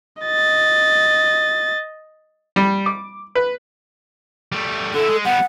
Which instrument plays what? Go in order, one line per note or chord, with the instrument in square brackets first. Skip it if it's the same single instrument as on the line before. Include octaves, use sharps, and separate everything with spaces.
[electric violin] D#5 A6
[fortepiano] G3
D6
B4
[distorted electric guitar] G3 A3
[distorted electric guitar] D3 E4 [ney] A4
[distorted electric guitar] G#3
[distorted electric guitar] G3 B3 [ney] F#5